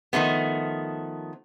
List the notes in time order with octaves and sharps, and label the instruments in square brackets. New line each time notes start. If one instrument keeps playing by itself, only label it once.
[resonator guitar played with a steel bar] D#3 F3 A3 B3